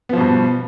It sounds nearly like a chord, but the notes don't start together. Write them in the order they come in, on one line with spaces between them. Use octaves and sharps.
B3 F3 B2 G2